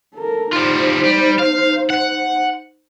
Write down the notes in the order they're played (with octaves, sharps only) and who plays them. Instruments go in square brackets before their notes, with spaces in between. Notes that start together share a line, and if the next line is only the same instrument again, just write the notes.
[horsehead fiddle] A4 A#4
[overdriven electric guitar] G3 F4 [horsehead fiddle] D#4 C5
[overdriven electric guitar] G3
F5
F#5